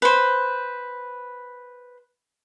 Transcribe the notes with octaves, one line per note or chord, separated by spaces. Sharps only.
B4 C5